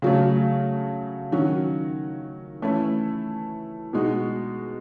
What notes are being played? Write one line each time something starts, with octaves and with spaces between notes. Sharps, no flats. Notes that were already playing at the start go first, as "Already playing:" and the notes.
C#3 F#3 A3
D#3 F#3 C#4 F#4
E3 A3 C#4 E4
B2 G#3 D#4 F#4